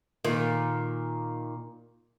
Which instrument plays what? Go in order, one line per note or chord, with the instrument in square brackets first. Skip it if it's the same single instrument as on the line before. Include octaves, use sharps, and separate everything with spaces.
[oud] A#2 D#3